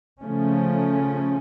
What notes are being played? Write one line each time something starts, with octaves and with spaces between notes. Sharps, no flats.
C#3 F3 A3 C#4